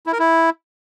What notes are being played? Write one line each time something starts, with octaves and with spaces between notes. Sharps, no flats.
E4
A#4
E4